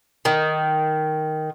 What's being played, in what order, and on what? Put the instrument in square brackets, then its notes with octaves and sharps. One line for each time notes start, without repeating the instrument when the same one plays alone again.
[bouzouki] D#3